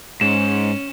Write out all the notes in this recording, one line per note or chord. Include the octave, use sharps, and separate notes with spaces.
G#2 C#4 E7